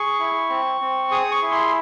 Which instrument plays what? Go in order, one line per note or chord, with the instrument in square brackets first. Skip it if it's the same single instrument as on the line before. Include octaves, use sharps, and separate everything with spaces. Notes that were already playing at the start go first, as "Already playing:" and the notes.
Already playing: [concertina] G#4 C#6
E4
C4
C4
G#4 D#6
C#6
E4
C6